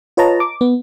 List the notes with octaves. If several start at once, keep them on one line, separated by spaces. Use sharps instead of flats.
F4 B4 C#5 D#5 A5 A#5
D6
B3